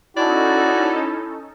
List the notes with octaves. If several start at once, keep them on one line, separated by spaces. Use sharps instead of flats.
C#4 D#4 E4 F#4 A4 D5